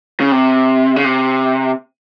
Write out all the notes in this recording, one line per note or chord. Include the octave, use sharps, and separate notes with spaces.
C#3
C3
C#3
C3